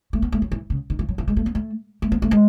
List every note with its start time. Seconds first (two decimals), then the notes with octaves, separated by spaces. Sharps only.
0.13 A3
0.22 B3
0.32 A3
0.42 F#3
0.52 E3
0.70 C#3
0.90 D#3
0.99 E3
1.09 F#3
1.18 E3
1.28 G#3
1.37 A3
1.46 B3
1.55 A3
2.02 A3
2.12 B3
2.22 A3
2.31 G#3